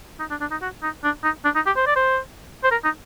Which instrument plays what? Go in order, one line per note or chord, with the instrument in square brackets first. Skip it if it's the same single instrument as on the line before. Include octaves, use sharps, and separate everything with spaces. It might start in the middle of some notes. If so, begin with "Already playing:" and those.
[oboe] D#4
D4
D4
D#4
F#4
D#4
D4
D#4
D4
D#4
G4
C5
D5
C5
C5
A#4
D#4